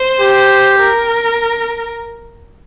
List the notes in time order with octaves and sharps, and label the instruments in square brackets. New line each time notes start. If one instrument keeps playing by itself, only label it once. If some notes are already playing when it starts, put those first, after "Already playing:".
Already playing: [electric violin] C5
[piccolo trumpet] G4
[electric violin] A#4